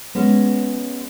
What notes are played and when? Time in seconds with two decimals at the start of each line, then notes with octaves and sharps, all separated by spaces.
0.15 G#3 B3 C#4